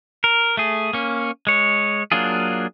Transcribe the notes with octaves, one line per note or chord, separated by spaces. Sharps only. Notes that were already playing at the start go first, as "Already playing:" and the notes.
A#4
A3 G#4
A#3 C#4
G#3 C#5
F#3 A#3 D4 F4 G#4